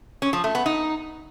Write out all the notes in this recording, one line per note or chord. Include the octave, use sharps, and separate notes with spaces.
C#4
F3
A3
B3
D#4